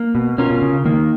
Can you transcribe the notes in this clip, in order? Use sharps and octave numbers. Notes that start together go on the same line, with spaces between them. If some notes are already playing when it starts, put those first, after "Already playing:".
Already playing: A#3
B2
B2 C#4 F4 A#4
B2
C#3
D#3 A#3